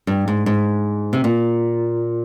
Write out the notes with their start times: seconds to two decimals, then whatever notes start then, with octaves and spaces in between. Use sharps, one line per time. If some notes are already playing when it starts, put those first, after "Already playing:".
0.07 G2
0.28 G#2
0.46 G#2
1.13 C3
1.24 A#2